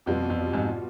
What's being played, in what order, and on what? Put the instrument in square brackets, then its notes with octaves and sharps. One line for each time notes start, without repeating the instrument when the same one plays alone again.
[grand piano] F2 [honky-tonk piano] B2 G3 B3 F4
[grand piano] F2
F2 G#2